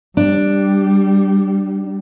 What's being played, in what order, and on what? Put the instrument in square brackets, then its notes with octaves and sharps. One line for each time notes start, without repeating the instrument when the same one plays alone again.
[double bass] G3 [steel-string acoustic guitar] D4